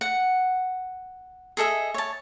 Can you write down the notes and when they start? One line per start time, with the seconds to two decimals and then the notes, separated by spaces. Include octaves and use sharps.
0.01 F#5
1.57 G#4 A4 D#5 E5
1.94 C#5 A5